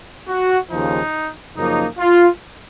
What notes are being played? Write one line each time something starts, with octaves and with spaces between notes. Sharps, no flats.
F#4
D#2 C#3 F3 D#4
F#2 C#3 F3 A#3 D#4
F4